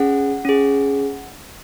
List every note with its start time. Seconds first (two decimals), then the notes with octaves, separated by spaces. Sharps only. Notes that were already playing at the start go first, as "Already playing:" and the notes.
Already playing: C#4 G#4 F#5
0.45 C#4 G#4